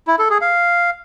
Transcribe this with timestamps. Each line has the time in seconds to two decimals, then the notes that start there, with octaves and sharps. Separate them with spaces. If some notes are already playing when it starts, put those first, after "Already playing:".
0.08 E4
0.19 A4
0.30 G#4
0.41 F5